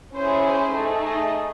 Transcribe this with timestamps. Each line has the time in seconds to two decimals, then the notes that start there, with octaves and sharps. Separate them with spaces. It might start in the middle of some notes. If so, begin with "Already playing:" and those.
0.14 C#4 E4 G#4 C5
0.45 C5
0.74 A3 D#4 G#4
1.04 D#5